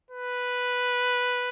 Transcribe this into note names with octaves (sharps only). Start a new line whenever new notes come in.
B4